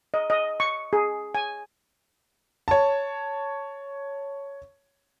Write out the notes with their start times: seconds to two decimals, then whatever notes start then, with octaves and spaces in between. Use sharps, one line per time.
0.14 D#5
0.30 D#5
0.60 C#6
0.93 G#4
1.35 G#5
2.68 C#5 A5